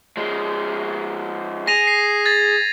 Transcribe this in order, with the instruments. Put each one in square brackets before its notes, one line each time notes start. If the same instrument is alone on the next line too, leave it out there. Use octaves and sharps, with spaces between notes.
[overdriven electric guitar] F3 G#3
[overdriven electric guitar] G#4 [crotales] A#6 D#7 F7
[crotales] C7
G#6 A6